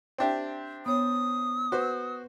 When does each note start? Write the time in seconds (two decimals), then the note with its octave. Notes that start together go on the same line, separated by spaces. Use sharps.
0.19 C4 D4 G4 E5 G5
0.86 B3 C#5 D#6
1.72 F#4 B4 C5